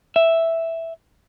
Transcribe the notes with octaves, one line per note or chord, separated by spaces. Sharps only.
E5